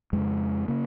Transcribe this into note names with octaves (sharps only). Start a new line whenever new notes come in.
F2 C#3 G#3
C#3 A#3